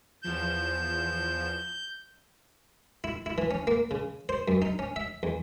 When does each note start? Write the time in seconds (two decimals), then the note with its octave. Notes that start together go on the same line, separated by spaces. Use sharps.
0.23 E2 F3 G6 E7
3.04 E4
3.26 E4
3.38 E3
3.51 C#4
3.67 A#3
3.91 C#3
4.29 C5
4.48 F#2
4.62 D#4
4.79 C#4
4.96 E5
5.23 E2